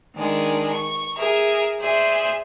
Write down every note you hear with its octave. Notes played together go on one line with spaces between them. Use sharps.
D#3 G#3 D4
C#6
G#4 A#4 E5
G#4 C5 D5 E5